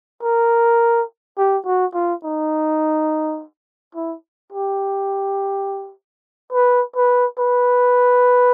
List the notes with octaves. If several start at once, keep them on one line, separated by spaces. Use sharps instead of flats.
A#4
G4
F#4
F4
D#4
E4
G4
B4
B4
B4